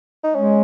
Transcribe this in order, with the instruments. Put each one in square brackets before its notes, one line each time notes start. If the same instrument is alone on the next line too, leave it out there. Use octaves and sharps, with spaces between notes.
[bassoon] D#4
[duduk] G#3 [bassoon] C#4